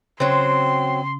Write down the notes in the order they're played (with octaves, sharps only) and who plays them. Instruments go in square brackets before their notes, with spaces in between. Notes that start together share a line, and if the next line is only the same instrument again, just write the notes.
[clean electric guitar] C#3 [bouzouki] F#3 C4 [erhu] C6